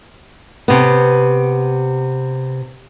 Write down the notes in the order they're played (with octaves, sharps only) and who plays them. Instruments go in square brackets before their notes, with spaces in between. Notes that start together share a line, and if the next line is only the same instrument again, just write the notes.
[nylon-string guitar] C3 B3